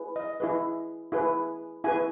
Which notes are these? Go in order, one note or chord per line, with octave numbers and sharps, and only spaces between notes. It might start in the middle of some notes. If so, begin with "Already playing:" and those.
Already playing: E4 G#4 B4
D#5
E4 G#4 B4
E4 G#4 B4
E4 G#4 B4 G#5